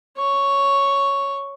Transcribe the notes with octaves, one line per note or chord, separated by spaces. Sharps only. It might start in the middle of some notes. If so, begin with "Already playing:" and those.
C#5 C#6